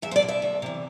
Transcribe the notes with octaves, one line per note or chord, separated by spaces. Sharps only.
E2 E5
C5
D5
B2
E5
D2
C3 E3